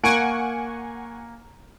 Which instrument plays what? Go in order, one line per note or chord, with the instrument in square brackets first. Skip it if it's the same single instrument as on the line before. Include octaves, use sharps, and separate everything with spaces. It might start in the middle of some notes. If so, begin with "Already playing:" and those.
[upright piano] A#3 D7 [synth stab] F#5 G#5 C#6